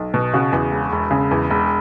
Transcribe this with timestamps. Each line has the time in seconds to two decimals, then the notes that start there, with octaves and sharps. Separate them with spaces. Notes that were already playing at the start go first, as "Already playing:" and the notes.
Already playing: B1
0.14 B2
0.34 C#3 F#4
0.53 E2
0.72 E1
0.92 E1
1.11 C#3
1.31 E2
1.50 E1